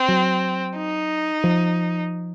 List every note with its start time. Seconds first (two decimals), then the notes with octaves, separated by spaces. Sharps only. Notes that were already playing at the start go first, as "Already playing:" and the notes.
Already playing: C4
0.08 F#3
0.77 D#4
1.44 F3